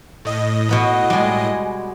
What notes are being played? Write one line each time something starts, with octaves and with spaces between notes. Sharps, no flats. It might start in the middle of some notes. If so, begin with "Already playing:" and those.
A2 D#5
B2 B3 B5
G3 G#3